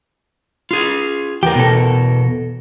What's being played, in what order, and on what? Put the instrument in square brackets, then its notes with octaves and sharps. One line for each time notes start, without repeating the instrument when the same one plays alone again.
[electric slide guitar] F4 G#4
[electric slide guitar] E2 A#4 [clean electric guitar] G4
[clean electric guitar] B2 A4